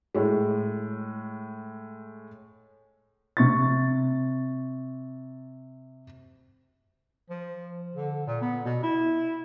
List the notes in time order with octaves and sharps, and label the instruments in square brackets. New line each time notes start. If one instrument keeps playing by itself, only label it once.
[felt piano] A2 G#3
[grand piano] C3 C#6 A6
[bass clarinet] F3
D3
A#2
B3
B2
E4